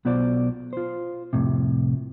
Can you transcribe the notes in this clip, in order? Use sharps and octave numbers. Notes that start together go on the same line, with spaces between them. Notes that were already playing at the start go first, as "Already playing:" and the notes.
B1 B3 F4 C5 D5
F4 C5
C2 F2 A2 C3